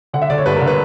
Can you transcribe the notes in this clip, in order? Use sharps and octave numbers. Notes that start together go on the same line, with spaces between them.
D3 F#5
E5
D3 D5
C#5
G2 B4
A#4
D3
B4